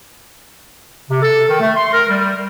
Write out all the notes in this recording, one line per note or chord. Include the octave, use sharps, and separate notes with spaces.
C3
A4
D#3
A3
C6
A#4
G3